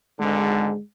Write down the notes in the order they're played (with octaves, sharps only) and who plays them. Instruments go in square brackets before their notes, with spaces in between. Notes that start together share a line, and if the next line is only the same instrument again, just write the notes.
[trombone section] G#1 G#2 D3 [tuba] G#3